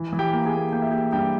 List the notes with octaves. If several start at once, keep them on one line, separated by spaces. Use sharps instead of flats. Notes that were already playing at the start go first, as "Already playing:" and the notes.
Already playing: E3
E3
G4 G5
A#3
G#4 G#5
A#3
A#3 G5
E5
A#3 G4 G5
G2 G4 G5